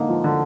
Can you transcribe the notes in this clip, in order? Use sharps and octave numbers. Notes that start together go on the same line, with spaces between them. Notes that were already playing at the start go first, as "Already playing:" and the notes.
Already playing: D3 A#3 D#4
F3
D3